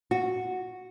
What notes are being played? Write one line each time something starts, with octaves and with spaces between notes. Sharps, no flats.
F#4